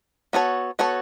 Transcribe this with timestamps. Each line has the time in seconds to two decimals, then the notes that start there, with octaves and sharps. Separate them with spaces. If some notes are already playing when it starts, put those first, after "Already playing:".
0.33 B3 F#4 A4 C#5
0.79 B3 F#4 A4 C#5